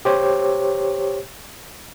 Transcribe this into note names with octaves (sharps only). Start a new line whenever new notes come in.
G4 C5 C#5